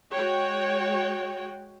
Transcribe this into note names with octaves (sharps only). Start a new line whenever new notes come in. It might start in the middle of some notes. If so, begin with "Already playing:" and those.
G#3 F#4 C#5 G5